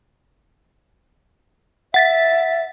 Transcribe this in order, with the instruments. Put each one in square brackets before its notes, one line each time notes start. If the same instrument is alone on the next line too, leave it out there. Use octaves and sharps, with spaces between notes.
[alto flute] E5 [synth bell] F#5 A6 B6